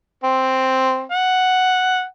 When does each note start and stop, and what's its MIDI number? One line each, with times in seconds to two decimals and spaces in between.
0.24 1.02 60
1.12 2.03 78